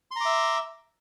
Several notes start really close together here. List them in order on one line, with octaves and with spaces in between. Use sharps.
C6 A#5 D6 E5